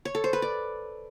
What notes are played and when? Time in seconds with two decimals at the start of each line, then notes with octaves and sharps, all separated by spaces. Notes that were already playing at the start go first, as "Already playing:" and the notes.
0.05 C#5
0.15 A4
0.24 C5
0.33 B4
0.42 D5